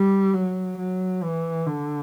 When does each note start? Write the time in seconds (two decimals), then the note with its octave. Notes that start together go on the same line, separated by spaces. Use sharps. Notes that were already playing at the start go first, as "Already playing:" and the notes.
Already playing: G3
0.34 F#3
0.78 F#3
1.23 E3
1.66 D3